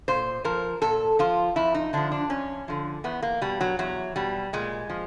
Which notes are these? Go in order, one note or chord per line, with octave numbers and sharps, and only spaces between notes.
A#2 C5
F3 A#4
A#2 A4
F3 F4
F2 E4
D#4
D3 F3 D4
D4
F2 C#4
D3 F3
E2 B3
A#3
B2 G3
F#3
E2 F#3
B2 G3
A#2 G#3
F3